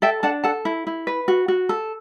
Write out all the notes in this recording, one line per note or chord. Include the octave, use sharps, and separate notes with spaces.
A4 E5 G5
D4 F#5 A5
A4 F#5 A5
E4
E4
B4
F#4
F#4
A4